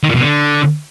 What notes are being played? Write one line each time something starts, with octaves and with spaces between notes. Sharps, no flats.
D#3
A#2
B2
D3